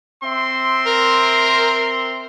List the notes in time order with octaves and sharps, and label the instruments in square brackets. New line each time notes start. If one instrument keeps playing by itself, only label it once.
[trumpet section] C4 E5 C6
[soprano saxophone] A#4